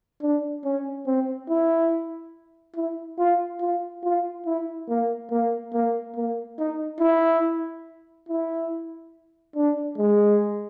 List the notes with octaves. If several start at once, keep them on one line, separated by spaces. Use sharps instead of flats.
D4
C#4
C4
E4
E4
F4
F4
F4
E4
A#3
A#3
A#3
A#3
D#4
E4
E4
D4
G#3